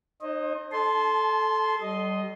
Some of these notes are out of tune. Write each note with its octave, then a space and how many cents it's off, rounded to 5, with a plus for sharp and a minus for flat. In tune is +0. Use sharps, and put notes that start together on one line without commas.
D#4 -35 C5 +35 D#5 +0
A4 -10 A5 -30 C6 +0
G3 -35 D#5 +5